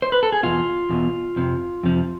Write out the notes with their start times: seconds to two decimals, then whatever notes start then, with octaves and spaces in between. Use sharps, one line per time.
0.02 C5
0.12 B4
0.23 A4
0.32 G#4
0.43 E2 B2 F4
0.89 E2 B2
1.36 F2 C3 F3
1.83 F2 C3 F3